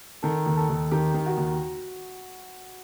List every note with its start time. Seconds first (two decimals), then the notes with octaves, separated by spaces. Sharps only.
0.23 D#3 A4
0.46 D#2
0.57 A4
0.69 D#2
0.91 D#3 G4
1.14 D#3
1.26 F#4
1.37 D#2